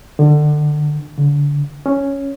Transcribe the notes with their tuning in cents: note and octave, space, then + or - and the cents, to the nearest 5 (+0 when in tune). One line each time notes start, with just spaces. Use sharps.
D3 +25
D3 -30
C#4 +0